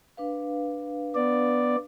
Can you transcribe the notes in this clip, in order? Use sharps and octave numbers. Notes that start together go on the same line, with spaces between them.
D4 B4 F5
B3 D5